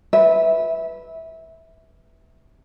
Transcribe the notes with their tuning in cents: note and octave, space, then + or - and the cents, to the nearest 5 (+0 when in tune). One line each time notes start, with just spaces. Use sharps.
B4 +0 E5 -20